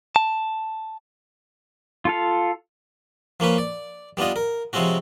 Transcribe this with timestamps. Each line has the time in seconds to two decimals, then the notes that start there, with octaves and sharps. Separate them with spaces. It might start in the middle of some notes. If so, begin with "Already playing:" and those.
0.16 A5
2.05 F4 A4 F5
3.40 F3 A#3 C#4 B4
3.58 D5
4.17 G3 B3 D4 F4 D#5
4.36 A#4
4.73 C3 F3 G#3 C4 C#4 F#4